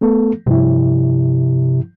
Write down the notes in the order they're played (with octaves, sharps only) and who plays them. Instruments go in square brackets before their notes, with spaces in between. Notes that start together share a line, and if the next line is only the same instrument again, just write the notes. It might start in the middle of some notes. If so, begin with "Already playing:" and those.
[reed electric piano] A3 B3 A4
[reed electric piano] G2 F3 E4 [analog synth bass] C3